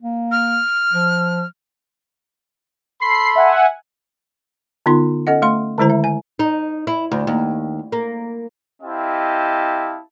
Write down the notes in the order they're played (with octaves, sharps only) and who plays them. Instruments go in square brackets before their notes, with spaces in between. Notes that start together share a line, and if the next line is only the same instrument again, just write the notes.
[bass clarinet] A#3
[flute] F6
[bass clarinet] F3
[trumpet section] A4 B5 C6 [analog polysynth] C7
[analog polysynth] E5 F#5 G#5
[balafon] D3 B3 D#4 F4 C6
C#4 A4 D#5 F#5
A3 F5 C6
D3 D#3 G#3 E4 C5 A#5
E5
G#5
[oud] D#4
E4
D2
D#2
A#3
[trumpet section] C4 E4 G4 D#5 F5 A5